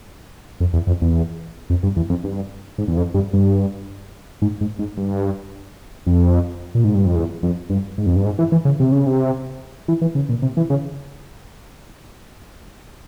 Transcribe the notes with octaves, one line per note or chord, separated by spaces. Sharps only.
F2
E2
F2
E2
F2
G2
E2
F2
G2
G#2
E2
F2
G2
G2
G#2
G#2
G#2
G2
F2
A#2
G#2
G2
F2
E2
F2
G2
G#2
F2
G2
G#2
E3
E3
C#3
C3
C#3
C3
E3
E3
C#3
A#2
C3
E3
C#3